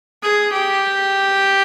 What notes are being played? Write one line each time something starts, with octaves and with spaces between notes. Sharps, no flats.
G#4
G4